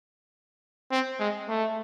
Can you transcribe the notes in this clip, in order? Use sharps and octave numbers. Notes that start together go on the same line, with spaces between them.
C4
G#3
A3